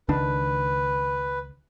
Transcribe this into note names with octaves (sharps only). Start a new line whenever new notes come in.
C#2 D#3 D4 B4